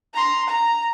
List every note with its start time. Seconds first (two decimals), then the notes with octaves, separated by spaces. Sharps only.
0.14 A#5 C6
0.48 A#5